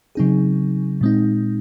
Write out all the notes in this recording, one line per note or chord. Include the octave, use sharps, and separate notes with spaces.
C#3 F#3 C4 D#4 G#4
A#2 G#3 C4 D#4